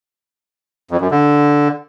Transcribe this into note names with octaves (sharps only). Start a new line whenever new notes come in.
F2
F#2
D3